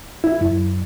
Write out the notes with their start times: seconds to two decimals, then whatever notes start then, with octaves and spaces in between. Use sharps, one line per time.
0.24 E4
0.41 F#2